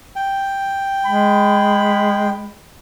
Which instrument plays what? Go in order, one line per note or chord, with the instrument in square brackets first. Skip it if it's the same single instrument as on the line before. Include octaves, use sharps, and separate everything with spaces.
[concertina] G5
[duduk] G#3 [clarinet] B5